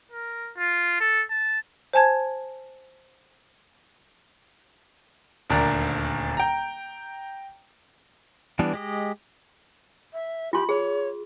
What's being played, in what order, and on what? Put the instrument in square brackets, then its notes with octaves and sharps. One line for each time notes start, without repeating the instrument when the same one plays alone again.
[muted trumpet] A#4
F4
A4
A5
[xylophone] C5 G#5 A5 G#6
[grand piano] D#1 D2 D3 D4 A#4 A#5
G5 A#5
[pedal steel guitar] E3 G3 B3 D4
G#3 G4 D#5
[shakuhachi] E5
[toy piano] F4 C6 [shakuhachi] G4
[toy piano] G#4 [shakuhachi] C#5